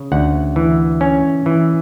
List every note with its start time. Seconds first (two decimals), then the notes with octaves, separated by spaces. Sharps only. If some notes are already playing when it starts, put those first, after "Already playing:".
Already playing: C#3
0.12 D2 F#5
0.56 E3
1.01 C#4
1.46 E3